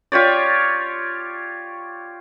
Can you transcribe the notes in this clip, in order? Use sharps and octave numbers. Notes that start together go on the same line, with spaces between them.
F4 G4 C#5 D5